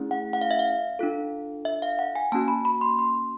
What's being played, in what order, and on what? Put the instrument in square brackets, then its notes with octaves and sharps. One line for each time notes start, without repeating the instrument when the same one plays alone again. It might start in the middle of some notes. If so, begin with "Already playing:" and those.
Already playing: [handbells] A3 C#4 E4 G#4
F#5
F#5
F5
E5
F5
D4 F4 A4
E5
F5
F#5
G#5
A#3 C#4 F#4 A5
B5
B5
C6
C6